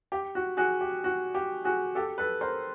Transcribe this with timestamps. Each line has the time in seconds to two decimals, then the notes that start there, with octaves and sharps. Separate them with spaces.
0.12 G4
0.35 F#4
0.57 F#4 G#4
0.81 G4
1.04 F#4
1.35 G4
1.64 F#4 G#4
1.95 G4 A4
2.18 A4 B4
2.41 A#4 C5